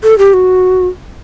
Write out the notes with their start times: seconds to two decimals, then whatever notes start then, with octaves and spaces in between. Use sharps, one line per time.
0.03 A4
0.18 G4
0.34 F#4